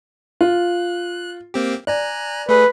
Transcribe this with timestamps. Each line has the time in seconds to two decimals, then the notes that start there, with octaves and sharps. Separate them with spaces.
0.41 F4 F#6
1.54 A#3 C4 G4
1.87 D5 G#5 A#5 F#6
2.49 A3 G#4 B4